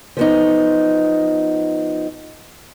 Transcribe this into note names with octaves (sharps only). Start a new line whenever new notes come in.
F3 B3 D#4